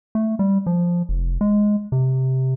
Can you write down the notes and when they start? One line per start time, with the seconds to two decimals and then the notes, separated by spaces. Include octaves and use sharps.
0.15 A3
0.39 G3
0.66 F3
1.09 F1
1.41 G#3
1.92 C3